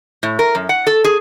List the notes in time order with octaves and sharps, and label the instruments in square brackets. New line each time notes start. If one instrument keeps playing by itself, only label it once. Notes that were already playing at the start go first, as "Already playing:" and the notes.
[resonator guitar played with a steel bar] A2
A#4
F#2
F#5
A4
G#4